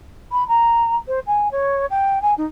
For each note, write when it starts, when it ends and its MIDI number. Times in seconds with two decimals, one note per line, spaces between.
0.32 0.47 83
0.48 0.96 82
1.07 1.19 72
1.27 1.48 80
1.52 1.86 73
1.90 2.21 79
2.22 2.34 80
2.37 2.45 63